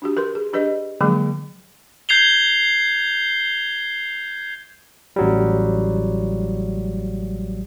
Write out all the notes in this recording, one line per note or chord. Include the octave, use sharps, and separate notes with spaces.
D4 F#4 G4
A#4 B4 C6
G#4
D4 G4 B4 D5 D#5
D3 F3 F#3 G#3 A#3 G#4
G6 G#6 C7 F7 G7
A1 F#3 G3